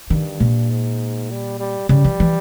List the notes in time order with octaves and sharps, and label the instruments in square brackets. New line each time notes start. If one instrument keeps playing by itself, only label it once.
[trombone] G2 [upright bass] D#3
[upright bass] A#2
[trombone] G#2
G3
G3
[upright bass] C#3 [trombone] G3
[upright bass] E3
E3